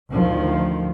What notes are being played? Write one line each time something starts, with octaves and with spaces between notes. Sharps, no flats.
A1 D2 D#3 F3